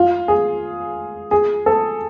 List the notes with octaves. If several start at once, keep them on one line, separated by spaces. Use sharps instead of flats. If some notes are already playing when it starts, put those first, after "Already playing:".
Already playing: F4
G#4
G#4
A4